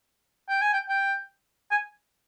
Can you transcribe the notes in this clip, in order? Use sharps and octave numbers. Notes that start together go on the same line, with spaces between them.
G5
G#5
G5
G5
G#5